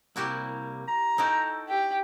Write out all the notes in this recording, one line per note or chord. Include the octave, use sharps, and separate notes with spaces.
C2 G3 A#3 E4 F#4 G4
A#5
D#4 E4 F#4 A4 G5
G4